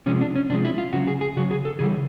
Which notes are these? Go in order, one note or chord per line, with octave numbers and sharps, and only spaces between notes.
C3 F3 G#3 C#4
D4
C#4
C3 F3 G#3 D4
E4
F4
C#3 F#3 F#4
G#4
G#4
C#3 F#3 F#4
G#4
A4
C#3 E3 G3 G#4